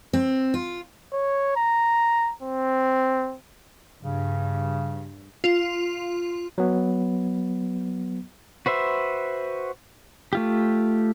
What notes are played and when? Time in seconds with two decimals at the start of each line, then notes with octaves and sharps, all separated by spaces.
0.13 C4
0.54 F4
1.12 C#5
1.56 A#5
2.43 C4
4.03 G2 C#3
5.44 F4
6.58 F#3 B3
8.66 F#4 B4 C5 E5
10.33 A3 F4 G4